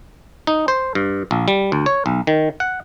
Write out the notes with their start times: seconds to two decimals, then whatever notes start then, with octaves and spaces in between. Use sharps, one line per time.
0.47 D#4
0.68 C5
0.95 G2
1.31 A#1
1.48 G3
1.72 D2
1.86 C#5
2.06 B1
2.27 D#3
2.60 F#5